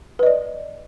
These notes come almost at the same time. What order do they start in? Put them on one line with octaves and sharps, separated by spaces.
B4 D#5 D5